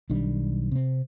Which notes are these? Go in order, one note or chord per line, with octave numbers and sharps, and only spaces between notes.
B1 D#3 G3 D4
C3 C4